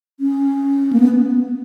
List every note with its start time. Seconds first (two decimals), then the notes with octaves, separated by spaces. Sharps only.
0.20 C#4
0.93 A#3
1.00 B3